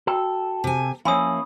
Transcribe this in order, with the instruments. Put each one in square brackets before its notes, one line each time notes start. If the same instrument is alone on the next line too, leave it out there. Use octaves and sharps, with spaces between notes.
[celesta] F#4 G5 [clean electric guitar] A4
[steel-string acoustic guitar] C3 G#5
[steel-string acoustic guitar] F3 [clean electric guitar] A#3 C#4 E4 [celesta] C#5 G#5 [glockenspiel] B5 D#6